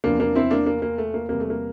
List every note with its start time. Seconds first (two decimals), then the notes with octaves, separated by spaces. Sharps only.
0.04 E2 C3 F3 A#3 D4
0.20 A#3 D4
0.35 C4 E4
0.51 A#3 D4
0.66 A#3
0.82 A#3
0.98 A3
1.14 A#3
1.29 E2 C3 G3 A#3
1.40 A3
1.50 A#3